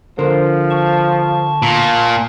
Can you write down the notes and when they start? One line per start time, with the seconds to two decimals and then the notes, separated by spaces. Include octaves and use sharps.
0.19 D3 F3 A#4 C5
0.71 A5 C#6
1.63 A#2